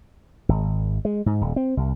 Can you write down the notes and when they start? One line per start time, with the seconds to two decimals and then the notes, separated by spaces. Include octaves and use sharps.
0.49 G#1
1.05 G#3
1.26 G#2
1.41 D#1
1.56 C4
1.77 C2